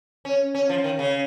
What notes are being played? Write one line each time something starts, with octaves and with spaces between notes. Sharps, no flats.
C#4
C#4
F3
D#3
C#3